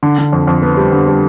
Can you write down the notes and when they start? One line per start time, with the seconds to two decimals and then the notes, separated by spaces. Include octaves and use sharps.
0.03 D3
0.18 D3
0.33 F2
0.47 F2
0.62 B3
0.77 G3
0.92 D3
1.07 G3